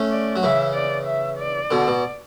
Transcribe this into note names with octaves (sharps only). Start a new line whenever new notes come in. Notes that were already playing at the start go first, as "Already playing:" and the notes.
Already playing: A3 C#4
D5
F#3
C#3 E3 E5
D5
E5
D5
B2 D3
B2